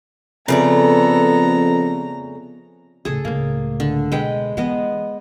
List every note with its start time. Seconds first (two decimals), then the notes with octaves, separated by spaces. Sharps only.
0.48 F2 C#3 A3 B3 A4 D5 A#5
3.05 C#2 A2 G#4 A4
3.25 C#2 A2 A#3
3.80 D3
4.12 B2 G#3 B4 G5
4.57 E3 G#3 B3 D#5